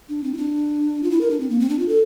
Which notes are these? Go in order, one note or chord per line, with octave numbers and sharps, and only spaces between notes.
D4
C4
E4
D4
F4
E4
A#4
D4
C4
A#3
C4
D4
F4
A4